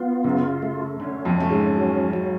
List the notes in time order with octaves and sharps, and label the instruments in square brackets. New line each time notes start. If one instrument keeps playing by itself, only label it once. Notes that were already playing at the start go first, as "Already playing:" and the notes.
Already playing: [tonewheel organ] B3 F4
[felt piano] F#2 F#3 [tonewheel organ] C#3
[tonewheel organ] A3
[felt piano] D3 [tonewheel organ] C#4
[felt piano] F2 F3
[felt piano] A3 [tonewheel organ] C#4
[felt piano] G#2 G#3
[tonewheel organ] F#3
F#3